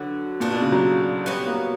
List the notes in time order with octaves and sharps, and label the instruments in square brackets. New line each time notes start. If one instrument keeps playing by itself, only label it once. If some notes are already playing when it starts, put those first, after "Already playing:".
Already playing: [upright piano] D3 [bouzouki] F#3 B3 F#4
[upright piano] A#2 [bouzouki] B3 D4 F#4
[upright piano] B2
C#3
F#3
[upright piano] G3 [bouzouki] B3 F#4 C#5
[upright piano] A#3